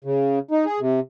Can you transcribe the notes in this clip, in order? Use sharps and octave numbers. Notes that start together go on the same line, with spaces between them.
C#3
D#4
G#4
C3